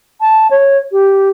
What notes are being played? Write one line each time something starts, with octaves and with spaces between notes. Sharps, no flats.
A5
C#5
G4